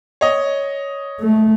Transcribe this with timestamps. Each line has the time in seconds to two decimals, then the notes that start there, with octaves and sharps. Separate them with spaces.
0.21 C#5 D#5
1.21 A3